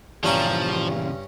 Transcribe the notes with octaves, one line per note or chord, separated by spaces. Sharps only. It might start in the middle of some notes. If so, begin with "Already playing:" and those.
G2 A#2 C#3 E3 F3 C#4 A#5